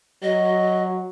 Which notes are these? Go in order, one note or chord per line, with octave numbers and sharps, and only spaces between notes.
F#3 D#5